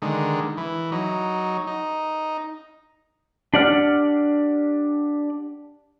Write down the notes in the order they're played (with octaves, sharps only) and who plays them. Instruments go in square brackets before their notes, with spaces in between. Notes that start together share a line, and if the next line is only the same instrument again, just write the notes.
[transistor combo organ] D3 D#3 G#3
E3
F#3 D#4
D#4
[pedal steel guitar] D4 G4 D5 F#5 F6